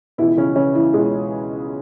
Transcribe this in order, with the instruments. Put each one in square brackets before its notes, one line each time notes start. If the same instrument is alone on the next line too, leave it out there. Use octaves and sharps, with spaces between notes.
[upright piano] C#2 B2 E3 E4
C#3 C#4
C#3 C#4
E3 E4
C#2 B2 G#3 G#4